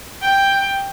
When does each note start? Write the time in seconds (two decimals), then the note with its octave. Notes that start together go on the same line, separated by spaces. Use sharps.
0.22 G5